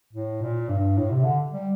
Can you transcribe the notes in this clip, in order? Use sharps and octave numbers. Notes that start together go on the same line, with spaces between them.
A2
A#2
G2
A2
C3
D3
G3